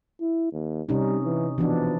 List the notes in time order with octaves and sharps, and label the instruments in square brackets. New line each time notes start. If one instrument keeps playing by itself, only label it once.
[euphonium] E4
D#2
[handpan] C3 C#4 D#4 [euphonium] G3
[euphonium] E3
[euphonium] B2 [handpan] E3 F3 D4